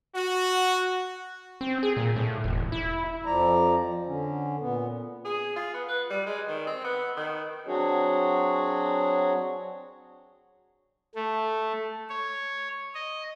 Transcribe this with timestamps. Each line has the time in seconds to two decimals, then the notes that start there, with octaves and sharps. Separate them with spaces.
0.15 F#4
1.61 C4
1.83 G#4
1.97 A#2
2.16 A2
2.44 E1
2.72 E4
3.26 F2 F3 D5 A#5
4.06 D3 C#4
4.61 A#2 B3
5.25 G#4
5.56 F4
5.74 B3
5.89 B4
6.10 G3
6.27 G#3
6.48 D#3
6.67 C4
6.84 B3
7.17 D#3
7.67 F#3 C4 D4 F#4 G#4 C#5
11.15 A3
12.09 C#5
12.95 D#5